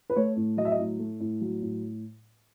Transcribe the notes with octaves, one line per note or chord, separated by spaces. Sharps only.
B4
A3 C#5
A2
F#3 D#5
E5
D#5
A2
A3
A2
F#3
A2